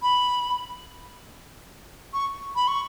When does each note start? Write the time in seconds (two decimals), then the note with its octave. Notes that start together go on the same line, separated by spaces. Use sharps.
0.02 B5
2.13 C#6
2.56 B5
2.68 C#6